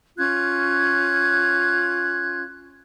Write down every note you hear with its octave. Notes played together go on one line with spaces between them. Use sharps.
C#4 F4 F#6 G#6